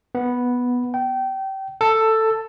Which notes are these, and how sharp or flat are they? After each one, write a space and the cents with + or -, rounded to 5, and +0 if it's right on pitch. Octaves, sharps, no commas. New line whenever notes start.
B3 -5
G5 -25
A4 +10